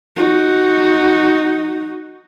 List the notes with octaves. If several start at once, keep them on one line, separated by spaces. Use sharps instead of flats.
D#4 F#4